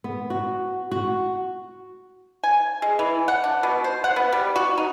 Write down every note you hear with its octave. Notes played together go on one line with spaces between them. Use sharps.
B3
F#4
F#4
G#5
G#3
E3
F#5
D4
B2
C5
F#5
B3
G3
F#4
D#4